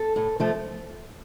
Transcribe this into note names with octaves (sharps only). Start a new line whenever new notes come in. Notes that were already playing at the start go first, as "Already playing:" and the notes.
Already playing: A4
A2
F3 A3